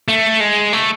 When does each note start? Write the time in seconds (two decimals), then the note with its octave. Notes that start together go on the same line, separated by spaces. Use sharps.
0.08 A3
0.40 G#3
0.73 A3